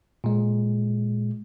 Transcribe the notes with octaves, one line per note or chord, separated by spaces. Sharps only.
A#2 G#3